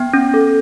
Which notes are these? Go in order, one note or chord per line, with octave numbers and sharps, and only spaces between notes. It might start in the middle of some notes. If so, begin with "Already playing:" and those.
Already playing: B3 G5
C#4
A4